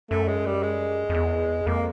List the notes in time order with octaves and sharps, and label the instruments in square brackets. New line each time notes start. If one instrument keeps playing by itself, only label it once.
[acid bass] F#2 [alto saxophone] A3
[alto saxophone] G#3
G3
G#3
[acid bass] F2
E2
[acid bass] F2 [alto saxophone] A#3